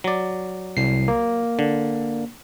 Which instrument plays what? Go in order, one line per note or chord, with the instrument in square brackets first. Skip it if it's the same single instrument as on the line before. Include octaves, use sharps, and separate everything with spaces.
[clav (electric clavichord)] F#3 D5
[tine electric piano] C2 C7
A#3
[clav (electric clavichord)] D3